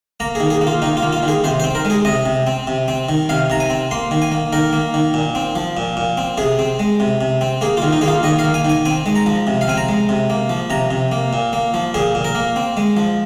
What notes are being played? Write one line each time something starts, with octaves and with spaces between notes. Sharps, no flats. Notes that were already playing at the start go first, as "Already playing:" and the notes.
A#3 A#5
G#4
D#3
G#4
A#3
F4
D#3 D#4
F4
A#3
F4
D#3
G#4
C3 C5
C5
C4
A#4
G#3
G#4
C3 D#5
C3
C4
C3
C4
D#3
C3 F5
C3 A#5
G#5
C4
A#3 C6
D#3
G#5
A#3
D#3 A#4
A#3
D#3
A#2
C4
F3
A#2
A#2
C4
C3 G#4
C4
G#3
C3
C3
C4
A#3 G#4
F4
D#3
D#4
A#3 G#4
F4
D#3 D#5
F5
A#3
G#5
D#3 G#5
C4 G#5
G#3
A#5
F3
C3
F5
C4 G#5
A#5
G#3
C3
A#3
F3
C3 A#5
C3
A#3
A#2
A#3
F3
A#2 G#4
A#2
A#4
A#3
C4
G#3
F3